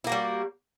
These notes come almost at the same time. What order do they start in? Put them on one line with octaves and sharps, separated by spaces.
E4 A#3 F#4 G3